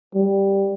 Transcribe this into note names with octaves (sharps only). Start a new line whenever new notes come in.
G3